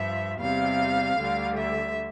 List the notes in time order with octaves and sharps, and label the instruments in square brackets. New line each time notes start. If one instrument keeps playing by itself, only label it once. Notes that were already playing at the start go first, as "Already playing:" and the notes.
Already playing: [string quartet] G2 F3 E5
E2 C3 G3 F5
D2 D3 G3
E5